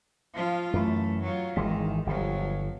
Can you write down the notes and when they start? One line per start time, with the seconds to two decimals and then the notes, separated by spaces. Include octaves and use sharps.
0.34 F3 F4
0.73 F#2 E3 A3
1.23 F#3 F4
1.57 G#1 D#3 E3 G#3
2.07 G1 F3 F#3